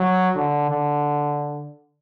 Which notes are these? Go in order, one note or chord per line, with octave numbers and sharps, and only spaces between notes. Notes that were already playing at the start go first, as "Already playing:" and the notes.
Already playing: F#3
D3
D3